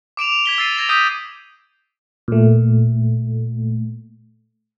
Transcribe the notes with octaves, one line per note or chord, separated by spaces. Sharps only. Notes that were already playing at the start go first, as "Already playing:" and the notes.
D6 D7 E7 F7
F7
G#6 B6 G7
E6 A6 C7 D#7
G#6 A#6 F7 G7
D#6 E6 G6 B6 D#7 F7
A#2 A3